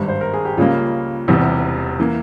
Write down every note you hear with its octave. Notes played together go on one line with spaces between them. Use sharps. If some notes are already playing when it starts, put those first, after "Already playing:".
Already playing: G#1 G2 G3
C5
A#4
G#4
G4
C#2 C#3 G3 A#3 F4
E1 E2 C3 E3 G3
E3 A#3